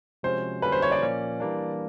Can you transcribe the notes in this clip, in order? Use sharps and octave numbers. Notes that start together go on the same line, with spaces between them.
C3 F3 G#3 C#4 F#4 C5
D3 G3 A#3 C#4 F#4 B4
C5
C#5
D5
A#2 F3 A#3 C#4
E3 G3 A#3 D4